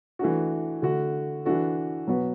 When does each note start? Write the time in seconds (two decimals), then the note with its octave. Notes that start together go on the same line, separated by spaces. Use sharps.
0.19 E3 A3 D4 F#4
0.82 D3 A3 F#4
1.45 E3 D4 F#4 A4
2.07 B2 F#3 B3 F#4 B4